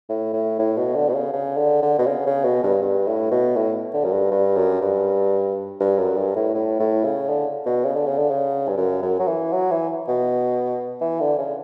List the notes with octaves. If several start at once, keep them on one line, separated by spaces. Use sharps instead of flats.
A2
A2
A2
B2
D3
B2
C#3
C#3
D3
D3
B2
C#3
C#3
B2
G2
G2
A2
B2
A2
D3
F#2
G2
G2
F#2
G2
G2
F#2
G2
A2
A2
A2
C#3
D3
B2
C#3
D3
C#3
D3
C#3
G2
F#2
F#2
F#3
E3
F#3
E3
B2
E3
D3
C#3